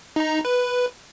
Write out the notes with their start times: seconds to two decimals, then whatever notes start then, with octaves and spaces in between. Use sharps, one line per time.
0.16 D#4 A#5
0.45 B4